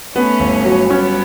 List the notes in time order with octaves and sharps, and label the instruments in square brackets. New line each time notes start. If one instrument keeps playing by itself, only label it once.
[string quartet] A3 C#4 [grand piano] B3
[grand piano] G1
F#3
[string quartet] G3 B3 [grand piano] C#4